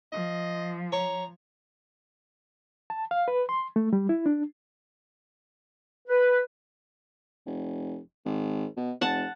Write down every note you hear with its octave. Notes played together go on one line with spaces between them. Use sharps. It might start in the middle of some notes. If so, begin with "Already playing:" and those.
F3 D#5
C#5 A#5
A5
F5
B4
C6
A3
G3
E4
D4
B4
F1
G#1
B2
F1 F#5 A5